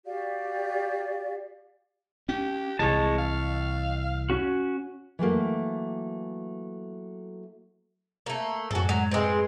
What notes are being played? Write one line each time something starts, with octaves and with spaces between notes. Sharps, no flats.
F#4 G4 D5 F5
C#4 G4
C2 C3 E3 G#3 C#5 A5
F5
C#4 F#4
E3 F#3 A3 A#3
A3 A#3
F#2 A2 F#4 A4 G#5
F#3 G#3
G#3 C4 B4 C6